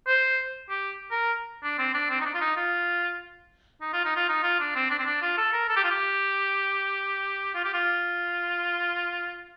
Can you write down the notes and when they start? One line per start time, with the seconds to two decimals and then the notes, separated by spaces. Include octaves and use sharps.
0.08 C5
0.70 G4
1.11 A#4
1.63 D4
1.79 C4
1.94 D4
2.10 C4
2.21 D#4
2.25 D4
2.35 F4
2.41 D#4
2.57 F4
3.81 D#4
3.93 F4
4.05 D#4
4.17 F4
4.29 D#4
4.43 F4
4.60 D4
4.76 C4
4.90 D4
4.99 C4
5.06 D4
5.22 F4
5.38 A4
5.53 A#4
5.69 A4
5.76 G4
5.84 F4
5.91 G4
7.55 F4
7.65 G4
7.74 F4